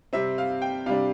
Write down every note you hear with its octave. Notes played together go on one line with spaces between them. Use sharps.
C3 G3 C4 E5
F5
G5
C3 G3 D4 F5